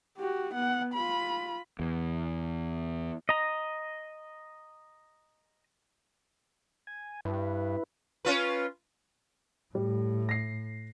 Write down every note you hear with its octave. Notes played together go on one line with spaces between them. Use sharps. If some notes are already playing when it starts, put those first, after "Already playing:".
F#4 G4
B3 F#5
F4 B5
E2
D#5 A#5
G#5
G2 E4 B4
C#4 F4 B4
A2 G3
A#6 C7